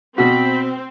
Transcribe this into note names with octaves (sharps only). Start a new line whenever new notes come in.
B2 C4 F#4 B5